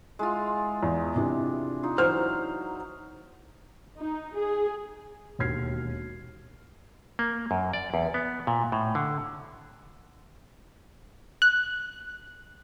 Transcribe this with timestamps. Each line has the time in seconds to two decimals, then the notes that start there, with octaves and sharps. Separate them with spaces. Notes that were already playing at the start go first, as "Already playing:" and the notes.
0.19 G#3 E4 F4
0.83 E2
1.16 C3 E3 D4
1.83 D#4 F4
1.98 E3 F#3 C5 F6
3.98 D#4
4.36 G#4
5.39 E1 D#2 F#4 F6 G#6 C7
7.19 A#3
7.51 F#2
7.73 D5
7.94 E2
8.14 B3
8.47 A#2
8.72 A2
8.95 D3
11.42 F#6